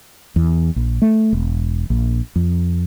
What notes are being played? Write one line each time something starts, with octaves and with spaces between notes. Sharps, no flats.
E2
A#1
A3
E1
A#1
F2